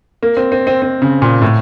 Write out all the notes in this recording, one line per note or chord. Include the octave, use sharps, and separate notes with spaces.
A#3
C4
C4
C4
C4
C#3
A#2
A2